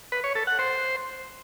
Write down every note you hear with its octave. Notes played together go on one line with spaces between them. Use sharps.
B4
C#5
A4
F#5
C5